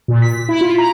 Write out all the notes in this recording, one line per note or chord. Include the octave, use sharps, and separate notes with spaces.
A#2
B6
E4
F4
A#5